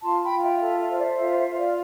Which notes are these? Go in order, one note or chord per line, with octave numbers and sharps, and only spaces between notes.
F4 A5 C6
G5 B5
F4
E5 G5
A4 E5
C5 E5
D5
E5
F4 E5
E5
F4
D5 F5